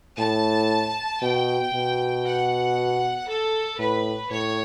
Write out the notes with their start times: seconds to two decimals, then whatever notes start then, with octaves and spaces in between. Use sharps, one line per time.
0.19 A2 A5
1.22 B2 G5
1.74 B2
2.25 F#5
3.28 A4
3.79 A2 B4
4.30 A2 C#5